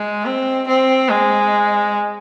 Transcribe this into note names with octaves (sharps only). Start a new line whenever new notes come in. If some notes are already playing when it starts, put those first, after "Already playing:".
Already playing: G#3
C4
C4
G#3